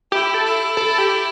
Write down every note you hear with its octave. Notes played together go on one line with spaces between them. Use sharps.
E4 G4
A4
E4
A4
G4